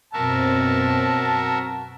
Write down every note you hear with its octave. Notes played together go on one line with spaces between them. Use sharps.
F#2 B2 C4 F#4 A#4 E5 A5